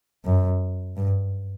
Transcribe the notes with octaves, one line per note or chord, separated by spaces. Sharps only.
F#2
G2